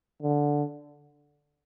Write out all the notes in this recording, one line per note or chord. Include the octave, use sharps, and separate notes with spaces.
D3